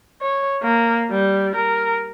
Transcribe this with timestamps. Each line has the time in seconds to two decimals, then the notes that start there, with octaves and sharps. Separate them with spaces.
0.22 C#5
0.63 A#3
1.11 G3
1.55 A#4